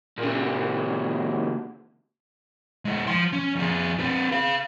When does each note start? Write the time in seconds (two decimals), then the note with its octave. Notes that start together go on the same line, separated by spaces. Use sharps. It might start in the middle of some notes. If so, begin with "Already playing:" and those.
0.18 A#2 C#3
2.85 G#3 E4
3.08 F3 C6
3.33 C#4
3.56 F2 G#4
3.99 C4 B4
4.32 G#4 F5